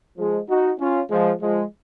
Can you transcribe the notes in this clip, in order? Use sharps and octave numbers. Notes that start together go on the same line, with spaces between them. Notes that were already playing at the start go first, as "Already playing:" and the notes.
F3 G#3
D#4 F#4
C#4 F4
F3 G#3
F3 G#3